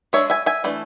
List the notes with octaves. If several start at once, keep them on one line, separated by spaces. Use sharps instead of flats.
G#3 D4 C#5 E5
E5 G#5
E5 G#5
E3 A3 D4